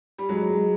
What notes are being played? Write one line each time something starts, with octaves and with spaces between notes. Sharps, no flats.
G3
F#3 G#3
G#3